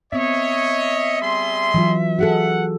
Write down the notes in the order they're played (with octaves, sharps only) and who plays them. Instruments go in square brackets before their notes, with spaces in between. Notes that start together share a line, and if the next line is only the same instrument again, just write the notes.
[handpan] B3 C4 [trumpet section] C#5 D#5 [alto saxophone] E5
[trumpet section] G3 G#4 C6
[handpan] E3 F#3 F4
[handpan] F#4 G#4 A4 [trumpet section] F#5